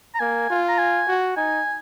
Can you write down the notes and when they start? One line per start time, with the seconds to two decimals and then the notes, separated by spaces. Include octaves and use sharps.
0.15 A#5
0.20 A#3 G#5
0.50 F4
0.69 A#5
0.78 G#5
1.08 F#4
1.36 D#4 G#5